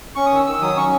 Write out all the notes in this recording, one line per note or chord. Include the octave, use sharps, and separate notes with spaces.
C#4 C#6
D#6
D#3 E6
D#3 E6
F#3 D#6
C#4 C#6